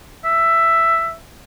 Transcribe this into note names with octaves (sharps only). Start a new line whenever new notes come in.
E5